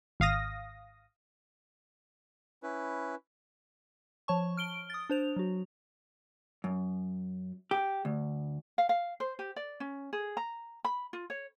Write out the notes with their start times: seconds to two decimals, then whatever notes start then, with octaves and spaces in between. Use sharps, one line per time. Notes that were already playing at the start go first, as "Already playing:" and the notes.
0.20 G#1 F5 D#6 A#6
2.63 C#4 E4 B4
4.28 F3 C#5 A5 C#6
4.57 F6 D7 G7
4.90 D#6 A6
5.10 D4 C5 F7
5.36 F#3 F#4
6.64 F#2
7.71 G4
8.05 D2
8.78 F5
8.89 F5
9.20 C5
9.39 G4
9.56 D5
9.80 C#4
10.13 G#4
10.37 A#5
10.85 B5
11.13 F4
11.30 C#5